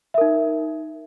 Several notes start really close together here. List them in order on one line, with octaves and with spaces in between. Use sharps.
E5 A#4 D#4